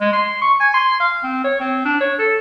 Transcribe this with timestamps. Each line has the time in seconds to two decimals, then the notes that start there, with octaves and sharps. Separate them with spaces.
0.01 G#3
0.13 C6
0.42 C#6
0.60 G#5
0.74 C6
1.00 F5
1.24 C4
1.44 C#5
1.60 C4
1.85 D4
2.01 C#5
2.19 A4